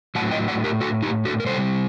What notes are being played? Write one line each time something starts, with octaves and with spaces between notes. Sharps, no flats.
A2 F#3 F#5 A5
D#5 G5
D5 F#5
G4 A#4
F#4 A4
D#4 G4
F#4 A4
A#4
C3 G3 A4 C5